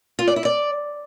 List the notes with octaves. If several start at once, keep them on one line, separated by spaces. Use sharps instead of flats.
F4
D5
E4
D5